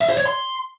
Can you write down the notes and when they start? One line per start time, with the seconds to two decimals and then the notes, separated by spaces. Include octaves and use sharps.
0.01 E5
0.09 C5
0.17 C#5
0.26 C6